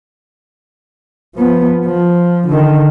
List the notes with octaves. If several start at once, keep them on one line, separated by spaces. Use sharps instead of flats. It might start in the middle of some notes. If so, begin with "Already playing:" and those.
F3 B3
F3
D3 D#3